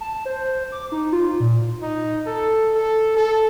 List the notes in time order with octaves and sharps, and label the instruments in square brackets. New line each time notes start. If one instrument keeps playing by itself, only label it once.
[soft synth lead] A5
C5
D6
D#4
F4
A#2
[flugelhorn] D#4
A4
A4
A4